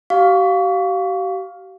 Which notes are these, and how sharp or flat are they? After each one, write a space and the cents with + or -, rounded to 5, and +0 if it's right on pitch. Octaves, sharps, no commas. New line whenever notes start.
G4 -45 F5 +10 C#6 +40